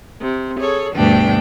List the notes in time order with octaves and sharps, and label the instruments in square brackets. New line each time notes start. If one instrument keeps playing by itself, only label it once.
[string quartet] C3
G#4 A4 C#5
D2 G2 B2 D4 G5